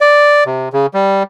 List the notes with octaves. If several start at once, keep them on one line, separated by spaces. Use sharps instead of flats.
D5
C3
C#3
G3